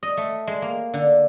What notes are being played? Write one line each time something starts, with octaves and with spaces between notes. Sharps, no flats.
D#5
A3
G#3
A#3
D3